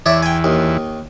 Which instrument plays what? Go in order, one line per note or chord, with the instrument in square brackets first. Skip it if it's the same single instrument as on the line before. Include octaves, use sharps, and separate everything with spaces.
[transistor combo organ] E2 [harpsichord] C#5 D5 E5
[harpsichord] G5 G#5
D#2